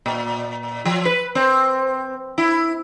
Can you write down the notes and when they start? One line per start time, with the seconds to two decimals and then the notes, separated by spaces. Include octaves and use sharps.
0.06 A#2
0.85 F3
1.05 B4
1.35 C4
2.38 E4